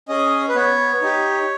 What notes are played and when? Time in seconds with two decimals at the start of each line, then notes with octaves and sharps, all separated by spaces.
0.08 C#4 G#4 D#5
0.49 B4
0.55 B3 C#5
1.02 D#4 G4